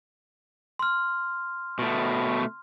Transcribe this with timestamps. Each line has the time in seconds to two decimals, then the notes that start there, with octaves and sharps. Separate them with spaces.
0.79 C6 F6
1.79 B2 A3